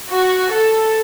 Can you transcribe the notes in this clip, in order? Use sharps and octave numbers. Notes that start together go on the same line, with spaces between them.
F#4
A4